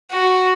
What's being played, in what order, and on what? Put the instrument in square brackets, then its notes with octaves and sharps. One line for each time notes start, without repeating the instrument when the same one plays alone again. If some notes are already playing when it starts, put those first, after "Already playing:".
[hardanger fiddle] F#4